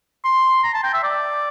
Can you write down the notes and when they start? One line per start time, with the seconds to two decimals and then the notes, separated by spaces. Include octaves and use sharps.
0.24 C6
0.63 A#5
0.74 A5
0.83 G5
0.93 E5
1.03 D5